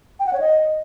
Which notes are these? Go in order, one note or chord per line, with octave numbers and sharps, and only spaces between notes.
G5
F#5
C#5
D#5